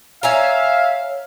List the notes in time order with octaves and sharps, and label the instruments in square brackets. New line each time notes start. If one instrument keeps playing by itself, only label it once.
[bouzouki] C#5 G#5 A#5 [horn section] E5 F5